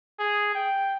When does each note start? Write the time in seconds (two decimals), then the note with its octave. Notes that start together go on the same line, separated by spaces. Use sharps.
0.19 G#4
0.55 G5